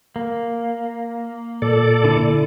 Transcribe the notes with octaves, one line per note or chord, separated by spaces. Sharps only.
A#3
A#2 A4 D5
D3 E4